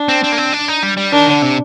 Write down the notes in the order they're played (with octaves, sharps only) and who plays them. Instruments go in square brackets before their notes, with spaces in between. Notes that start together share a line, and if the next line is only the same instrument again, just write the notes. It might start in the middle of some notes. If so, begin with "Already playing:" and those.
Already playing: [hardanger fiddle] D4
[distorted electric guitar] C4
C4
A#3
C4
D4
D#4
G3
G3
[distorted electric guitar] D#3 [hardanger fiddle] D4
[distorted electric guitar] D3
C3